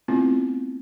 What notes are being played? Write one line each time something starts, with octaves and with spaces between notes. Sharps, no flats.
A3 B3 C4 E4 F4